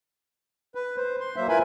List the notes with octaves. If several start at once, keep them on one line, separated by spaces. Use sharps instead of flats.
B4
C5
C6
F#3 A#3 C5 E5
E4 F4 A#4 B4 G#5 B5